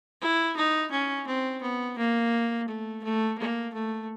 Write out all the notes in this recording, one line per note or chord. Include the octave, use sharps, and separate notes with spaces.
E4
D#4
C#4
C4
B3
A#3
A3
A3
A#3
A3